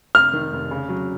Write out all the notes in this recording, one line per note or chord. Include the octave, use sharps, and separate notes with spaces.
F1 F6
D#3
F1
C#3
F#3